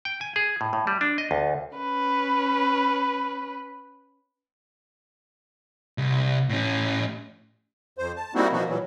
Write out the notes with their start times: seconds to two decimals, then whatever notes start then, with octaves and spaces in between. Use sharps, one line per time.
0.05 G5
0.21 G#5
0.36 G#4
0.61 A2
0.73 A2
0.87 G3
1.01 D4
1.18 D#5
1.31 D2
1.77 C#4 B4
5.98 C2
6.50 A2 C#4
7.98 F2 C5
8.16 A5
8.35 G3 A#3 C4 D#4 E4 F#4
8.52 B2 E3 F3 A#3 B3 F#4
8.67 A#2 E3 F#3 G3